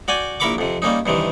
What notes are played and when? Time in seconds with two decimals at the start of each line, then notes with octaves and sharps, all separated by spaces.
0.08 F#4 D5 G5 G#5
0.40 A#1 E4 A#4 B5 C#6 D6
0.58 F2 C3
0.82 G3 A#3 C#4 D#4
1.06 G2 C3 D#3 E3